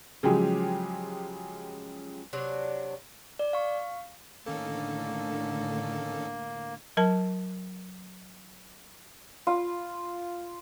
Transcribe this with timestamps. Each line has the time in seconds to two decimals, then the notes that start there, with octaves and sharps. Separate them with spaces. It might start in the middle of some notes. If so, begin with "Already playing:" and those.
0.23 C#3 F3 F#3 G#3 G4 G#4
2.33 C3 F#3 D4
3.39 D5
3.53 F5 C#6
4.46 A2 D3 D#3 A#3 C#4 A4
6.97 F#3 A#4 A5
9.47 F4